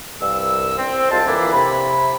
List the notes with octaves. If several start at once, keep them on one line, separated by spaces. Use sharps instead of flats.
C2 G2 E6
C4
C2 G#3 F4 C5 A5
F2 D3 E3 A#3 D4 E4
C3 B5